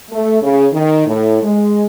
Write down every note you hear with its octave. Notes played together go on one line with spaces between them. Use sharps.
A3
C#3
D#3
A2
G#3